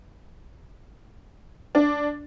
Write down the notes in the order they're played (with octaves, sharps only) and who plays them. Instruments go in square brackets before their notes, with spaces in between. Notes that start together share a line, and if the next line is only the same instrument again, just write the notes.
[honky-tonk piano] D4